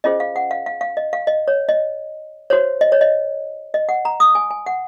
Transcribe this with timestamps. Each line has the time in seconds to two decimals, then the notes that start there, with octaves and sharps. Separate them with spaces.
0.04 C#4 F4 G#4 C5 D#5
0.20 F5
0.36 F#5
0.51 F5
0.66 F5
0.81 F5
0.97 D#5
1.13 F5
1.27 D#5
1.48 C#5
1.69 D#5
2.50 F#4 C5 C#5
2.81 D#5
2.92 C#5
3.01 D#5
3.74 D#5
3.89 F#5
4.05 A#5
4.20 D#6
4.35 G#5
4.51 G#5
4.66 F#5